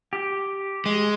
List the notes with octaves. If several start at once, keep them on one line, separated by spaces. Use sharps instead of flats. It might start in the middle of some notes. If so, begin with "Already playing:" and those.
G4
G#3